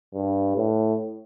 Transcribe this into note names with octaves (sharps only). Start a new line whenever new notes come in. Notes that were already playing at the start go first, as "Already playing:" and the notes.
G2
A2